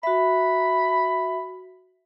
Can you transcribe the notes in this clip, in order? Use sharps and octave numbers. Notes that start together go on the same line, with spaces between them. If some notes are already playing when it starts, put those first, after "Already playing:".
F#4 E5 B5